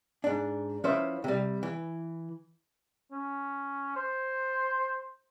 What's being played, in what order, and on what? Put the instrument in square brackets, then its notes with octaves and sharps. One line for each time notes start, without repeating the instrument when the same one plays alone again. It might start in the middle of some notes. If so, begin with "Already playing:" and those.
[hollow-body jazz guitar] G#2 D4
F3 C#4 E4 B4 C5 E5
C3 G3
E3
[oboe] C#4
C5